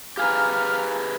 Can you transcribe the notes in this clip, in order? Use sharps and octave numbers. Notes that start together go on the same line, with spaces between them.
G4 G#4 B4 F5 G#5 A#5 F6